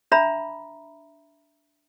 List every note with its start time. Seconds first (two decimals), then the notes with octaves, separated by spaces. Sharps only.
0.12 D4 E5 A#5 B5